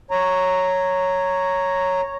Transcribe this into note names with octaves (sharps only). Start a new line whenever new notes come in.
C#5 A#5